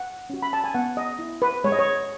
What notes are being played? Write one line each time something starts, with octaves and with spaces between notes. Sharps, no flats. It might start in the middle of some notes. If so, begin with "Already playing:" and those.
Already playing: F#5
C#4 F#4
B5
A5
G#5
B3 F#5
D#5
E4
B4
G#3 C#5
D#5
C#5